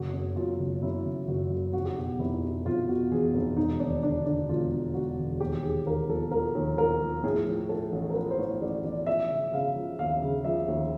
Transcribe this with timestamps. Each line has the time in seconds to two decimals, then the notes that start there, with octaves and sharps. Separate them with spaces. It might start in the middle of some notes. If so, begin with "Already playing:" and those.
Already playing: F#1 F#4
0.13 F#2
0.36 F#2 F4
0.59 F#1
0.82 F#2 E4
1.05 F#1
1.27 F#1 F#4
1.51 F#2
1.73 F1 F#4
1.85 G4
1.97 B2 F#4
2.19 F1 E4
2.43 B2
2.66 F1 F4
2.88 B2 F#4
3.11 E2 G#4
3.33 F1
3.57 E1 D#4
3.80 D#2 D4
4.03 D3 D4
4.26 D3 D4
4.49 E1 F4
4.71 D3
4.94 D3 F#4
5.17 E1
5.40 D#2 G4
5.63 D#2 G#4
5.86 D#2 A#4
6.09 F3 A4
6.31 F3 A#4
6.55 D#2
6.77 F3 A#4
7.01 F3
7.23 A2 G#4
7.46 F3
7.69 F3 A4
7.92 A1
8.10 A#4
8.15 F3 B4
8.31 C5
8.38 A2 C#5
8.61 A1 D5
8.84 A1 D5
9.06 F3 E5
9.30 C#3
9.52 C#3 F5
9.76 F3
9.99 D#2 F5
10.22 C#3
10.44 F3 E5
10.68 D#2